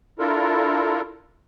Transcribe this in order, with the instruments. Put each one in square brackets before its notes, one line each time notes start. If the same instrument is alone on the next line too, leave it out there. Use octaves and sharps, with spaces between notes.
[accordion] D4 E4 F4 A4 A#4